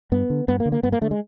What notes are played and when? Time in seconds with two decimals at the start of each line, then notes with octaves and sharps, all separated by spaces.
0.12 G2 B3
0.30 D3
0.48 G2 B3
0.60 A#3
0.66 D3
0.72 A#3
0.83 G2 B3
0.92 A#3
1.01 D3 A3
1.11 G#3